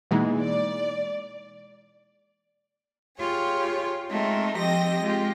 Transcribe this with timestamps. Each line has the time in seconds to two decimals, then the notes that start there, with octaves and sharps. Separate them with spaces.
0.11 B2 E3 G#3 A#3 D#4
0.41 D5
3.19 F4 G4 G#4 C#5
4.10 G#3 A3 C4 D#4 F4
4.57 F3 C4 G4 D#5 A#6
5.02 G#3 F4 G4